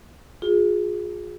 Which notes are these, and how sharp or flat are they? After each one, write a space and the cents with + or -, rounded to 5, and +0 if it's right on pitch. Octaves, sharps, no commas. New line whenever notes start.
F4 +35 G#4 +0